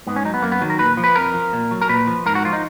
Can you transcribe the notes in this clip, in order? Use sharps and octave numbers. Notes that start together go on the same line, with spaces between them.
G#2 B3
C#4
F#3 D#4
B3
F#2 A#3
B3
D#3 F#3
A#4
A#2 B4
F3
B4
F2 A#4
F3
A#2
F#3
A#4
A#2 B4
F3
G#2 A#4
F#4
F3 F4
D#4